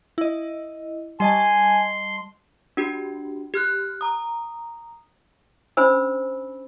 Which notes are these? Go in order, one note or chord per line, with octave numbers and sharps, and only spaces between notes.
E4 D#5
G3 D#5 G#5 A5 C6
D4 F#4 G4
G4 F6 F#6
A#5 D#6
C#4 D4 C5 G#5 B5 E6